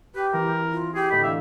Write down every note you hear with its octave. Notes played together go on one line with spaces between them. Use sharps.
G4 B4
E3 C4 A#4
F4
G4 G#4
D2 A2 D#5 B5
D4 D5 E5 F5